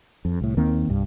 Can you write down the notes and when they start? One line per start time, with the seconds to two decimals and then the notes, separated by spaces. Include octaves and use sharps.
0.25 F2
0.41 C2 A2
0.57 D#2 D#3 A#3 C4
0.89 C2 G2